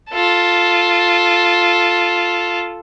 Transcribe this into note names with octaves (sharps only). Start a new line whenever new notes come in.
F4 A4